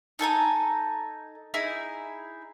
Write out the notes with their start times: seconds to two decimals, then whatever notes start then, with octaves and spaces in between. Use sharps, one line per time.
0.19 D#4 A4 G#5 A#5
1.54 D#4 E4 G#4